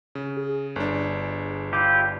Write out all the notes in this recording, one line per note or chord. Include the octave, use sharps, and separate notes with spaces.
C#3
G#4
G1 D4
E4 F4 G4 D6